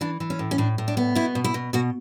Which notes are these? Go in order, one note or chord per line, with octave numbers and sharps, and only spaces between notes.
E3 D4
E3
C#4
A2
C#4
A2 D4
A2
D4
B3
B2 E4
B2
E4
B2
B2 F#4